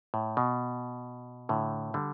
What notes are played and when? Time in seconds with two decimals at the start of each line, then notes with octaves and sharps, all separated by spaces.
0.14 A2
0.37 B2
1.49 A2 D3
1.94 D3 G3